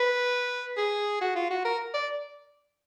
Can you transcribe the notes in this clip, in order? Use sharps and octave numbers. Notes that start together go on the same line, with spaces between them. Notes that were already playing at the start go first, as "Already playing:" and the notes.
Already playing: B4
G#4
F#4
F4
F#4
A#4
D5